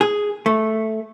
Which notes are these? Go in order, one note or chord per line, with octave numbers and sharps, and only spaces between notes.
G#4
A3